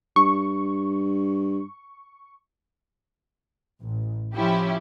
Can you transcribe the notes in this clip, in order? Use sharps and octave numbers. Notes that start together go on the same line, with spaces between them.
G2 C#6
A1
F3 C#4 E4 G4